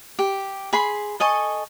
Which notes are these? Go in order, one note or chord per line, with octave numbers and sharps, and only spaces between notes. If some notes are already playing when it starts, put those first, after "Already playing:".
G4
G#4 B5 C6
A4 D#5 G#5 C#6